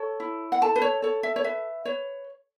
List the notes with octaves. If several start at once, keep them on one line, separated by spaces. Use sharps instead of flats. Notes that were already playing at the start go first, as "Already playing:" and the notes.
Already playing: A4 C#5
E4
F#5
A4 A5
B4
C#5
A4 C#5
E5
C#5
B4 E5
B4 C#5